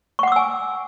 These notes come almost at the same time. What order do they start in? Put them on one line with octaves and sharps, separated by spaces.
C#6 F#5 D6 E6 G#5